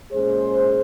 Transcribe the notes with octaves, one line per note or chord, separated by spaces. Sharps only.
A#2 G#3 C#4 G#4 C5